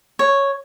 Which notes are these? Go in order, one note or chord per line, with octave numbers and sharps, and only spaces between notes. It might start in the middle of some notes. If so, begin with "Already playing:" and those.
C#5